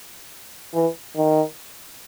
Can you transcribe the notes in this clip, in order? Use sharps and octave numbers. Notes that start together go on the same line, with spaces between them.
E3
D#3